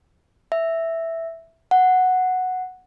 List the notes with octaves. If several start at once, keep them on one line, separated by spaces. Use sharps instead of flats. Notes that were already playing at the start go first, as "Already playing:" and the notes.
E5
F#5